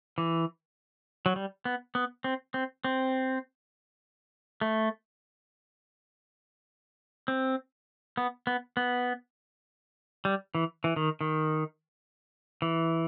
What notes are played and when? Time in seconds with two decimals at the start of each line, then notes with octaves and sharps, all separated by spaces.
0.18 E3
1.26 F#3
1.36 G3
1.65 B3
1.95 B3
2.24 C4
2.54 C4
2.84 C4
4.61 A3
7.28 C4
8.17 B3
8.47 B3
8.77 B3
10.25 G3
10.55 E3
10.84 E3
10.96 D#3
11.21 D#3
12.62 E3